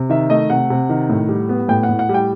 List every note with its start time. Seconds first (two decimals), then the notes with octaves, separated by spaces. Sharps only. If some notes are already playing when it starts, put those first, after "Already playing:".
Already playing: C3
0.09 D#3 E5
0.30 A3 D#5
0.50 C3 F#5
0.70 C3
0.89 D#3
1.10 A2
1.29 G3
1.49 B3
1.68 A2 G5
1.83 F#5
1.89 A2
1.99 F#5
2.09 G3
2.14 G5